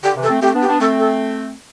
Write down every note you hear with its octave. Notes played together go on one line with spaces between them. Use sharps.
D3 G4
C3 E3
A4
A3 C4
A3 C4 G4
B3 D4
G4
B3 D4
A3 C4 A4
A4